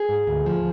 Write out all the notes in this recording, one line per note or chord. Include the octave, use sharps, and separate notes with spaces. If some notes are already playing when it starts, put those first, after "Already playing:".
Already playing: G#4
G#2
D2
F3